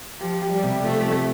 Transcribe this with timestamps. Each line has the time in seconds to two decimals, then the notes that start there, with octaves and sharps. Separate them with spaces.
0.21 F3 G4
0.42 G4
0.52 G3
0.63 C3
0.84 F3 A3
1.06 C4